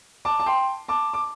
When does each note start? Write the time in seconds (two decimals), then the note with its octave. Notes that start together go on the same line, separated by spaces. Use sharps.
0.25 A5 D6
0.40 A5
0.46 G5 C6
0.88 A5 D6
1.13 D6